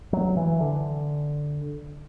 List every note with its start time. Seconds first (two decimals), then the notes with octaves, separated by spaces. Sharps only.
0.13 F#3
0.37 E3
0.60 D3